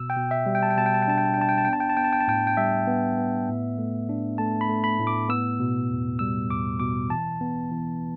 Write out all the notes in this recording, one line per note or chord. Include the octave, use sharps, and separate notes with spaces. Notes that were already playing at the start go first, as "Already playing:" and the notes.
Already playing: B2 E6
G5
B2
E5
G3
G5
A5
G5
B2 A5
G5
A5
G5
D4 A5
G5
A5
G5
D4 A5
G5
A5
B3 G5
A5
G5
A5
B3 G5
A5
G5
A5
A2 G5
G5
G3 E5
B3
B3
A2
A3
D4
A3 A5
B5
A3
B5
A2
D6
B3 E6
B2
E2
G3 E6
E2 D6
B2 D6
E3 A5
B3
E3